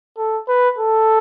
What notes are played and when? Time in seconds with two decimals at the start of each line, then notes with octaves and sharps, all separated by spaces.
0.17 A4
0.48 B4
0.78 A4